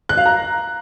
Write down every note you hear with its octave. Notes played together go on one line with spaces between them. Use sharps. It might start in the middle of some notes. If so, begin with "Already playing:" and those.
F#6
F5
A#5